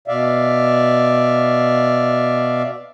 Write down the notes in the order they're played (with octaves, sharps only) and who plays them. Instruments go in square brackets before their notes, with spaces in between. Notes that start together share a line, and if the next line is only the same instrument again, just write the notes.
[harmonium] B2 D5 E5 F5